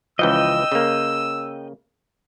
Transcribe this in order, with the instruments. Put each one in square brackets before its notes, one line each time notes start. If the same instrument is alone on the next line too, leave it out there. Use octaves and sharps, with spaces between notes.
[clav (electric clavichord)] C#2 E3 F3 [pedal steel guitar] D#5 G5 [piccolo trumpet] E6
[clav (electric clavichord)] C#3 A#3